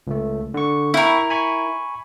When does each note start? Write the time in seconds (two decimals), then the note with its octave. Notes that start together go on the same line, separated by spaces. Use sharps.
0.07 C#2 A3
0.54 D3 C#6
0.94 E4 A#4 E5 G5 C#6
1.30 G#5 B5 C#6